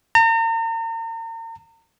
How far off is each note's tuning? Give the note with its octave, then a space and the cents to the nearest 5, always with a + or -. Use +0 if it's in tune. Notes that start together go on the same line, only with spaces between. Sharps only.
A#5 -40